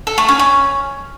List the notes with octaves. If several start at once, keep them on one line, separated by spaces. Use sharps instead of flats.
A4
A3
C#4
C#4